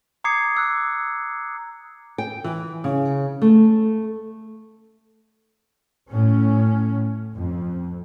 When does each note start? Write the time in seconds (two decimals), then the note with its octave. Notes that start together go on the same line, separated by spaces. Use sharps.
0.24 A#5 D6 D#6 G#6 C7 C#7
0.55 D6 E6 F#6
2.18 G5
2.44 E3
2.84 C#3
3.42 A3
6.11 A2 C#4
7.34 F2